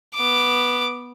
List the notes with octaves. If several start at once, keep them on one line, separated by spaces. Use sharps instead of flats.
B3 D6